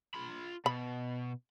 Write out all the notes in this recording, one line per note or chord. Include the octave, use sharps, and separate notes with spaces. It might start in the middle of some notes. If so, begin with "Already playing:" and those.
F4 B5
B2 B5